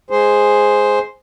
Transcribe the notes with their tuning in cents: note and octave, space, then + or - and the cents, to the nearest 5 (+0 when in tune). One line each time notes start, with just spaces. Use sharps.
G#3 +0 G#4 +0 C5 +0